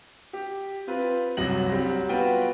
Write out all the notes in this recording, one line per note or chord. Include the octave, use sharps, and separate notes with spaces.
G4
C4 F4 B4
C2 F#2 F#3 A#6 F#7
F#3 G3 C4
B3 F4 F#4 B4 G5